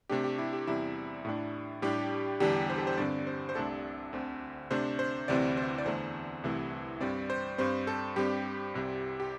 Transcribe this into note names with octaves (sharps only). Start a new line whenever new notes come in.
C3 A3 D4 G4
G4
E4
G4
E2 C3 G3 E4
A2 A3 D4
A2 G3 D4 G4
E2 D3 G3 D4 G4
C5
A4
C5
G2 D3 C4 D5
C5
C5
C2 C3 A3 D4 A4
D2 D3 C4
C3 A3 D4 C5
C5
D2 C3 E3 C4 D5
C5
D5
E2 D3 A3 C5
C2 C3 E3 A3
G2 G3 C4 D5
C5
G2 G3 C4 C5
A4
G2 G3 C4 G4
C2 C3 G3
G4